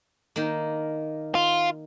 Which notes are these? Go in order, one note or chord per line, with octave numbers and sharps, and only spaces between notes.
D#3 A#3
F4